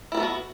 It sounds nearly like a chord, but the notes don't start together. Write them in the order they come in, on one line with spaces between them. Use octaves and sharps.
E4 B4 A4 B3 F#4